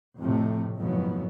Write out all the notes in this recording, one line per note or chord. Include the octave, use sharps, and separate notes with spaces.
F2 A2 C3 A3
F#1 F2 G#2 B2 F#3 B3